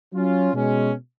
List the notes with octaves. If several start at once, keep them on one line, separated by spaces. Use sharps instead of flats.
F#3 C#4 F4
B2 G#3 C#4